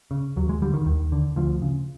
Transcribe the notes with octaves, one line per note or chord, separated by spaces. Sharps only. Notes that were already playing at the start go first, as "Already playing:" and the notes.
C#3
D#2 F#3
G#3
D3 G3
D#3
D#2 D#3
D3
D2 F3
C#3